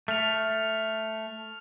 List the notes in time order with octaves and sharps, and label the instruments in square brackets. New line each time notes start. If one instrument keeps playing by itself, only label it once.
[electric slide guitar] A3 [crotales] F6 F7